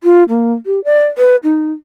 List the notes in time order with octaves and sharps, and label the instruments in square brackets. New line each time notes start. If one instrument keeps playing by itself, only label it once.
[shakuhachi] F4
A#3
G4
D5
B4
D#4